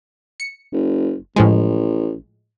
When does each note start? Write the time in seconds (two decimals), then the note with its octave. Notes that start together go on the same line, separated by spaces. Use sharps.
0.40 C#7
0.73 F#1
1.36 A1 A2 F3 G#3